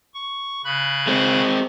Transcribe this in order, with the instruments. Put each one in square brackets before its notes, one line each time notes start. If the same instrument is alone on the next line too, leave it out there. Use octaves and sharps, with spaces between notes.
[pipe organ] C#6
C#3 B5 F#6
[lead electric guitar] G#3 C4